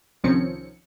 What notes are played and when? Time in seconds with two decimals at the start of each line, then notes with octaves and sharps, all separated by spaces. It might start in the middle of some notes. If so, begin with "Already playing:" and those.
0.24 C2 D#3 F3 C4 C#4 C#7